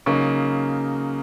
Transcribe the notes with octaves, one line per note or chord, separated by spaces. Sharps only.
C#3 F#3 A#3 D#4 C#6